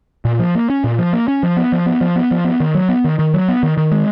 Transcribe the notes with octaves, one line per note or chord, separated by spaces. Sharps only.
A#2
F3
A#3
C#4
A#2
F3
A#3
C#4
F3
B3
F3
B3
F3
B3
F3
B3
D#3
F#3
B3
D#3
D#3
F#3
B3
D#3
D#3
G#3